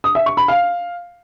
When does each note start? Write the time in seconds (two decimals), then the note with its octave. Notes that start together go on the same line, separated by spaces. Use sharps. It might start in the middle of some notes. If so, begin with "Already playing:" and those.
0.04 D#6
0.15 E5
0.26 C#6
0.37 B5
0.48 F5